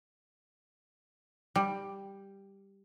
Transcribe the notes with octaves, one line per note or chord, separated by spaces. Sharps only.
G3